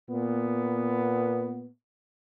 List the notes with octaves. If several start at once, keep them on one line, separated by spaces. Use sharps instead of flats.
A#2 B3